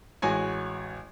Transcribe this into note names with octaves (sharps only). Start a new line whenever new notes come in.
A1 G#3 F#4 C#5 G#5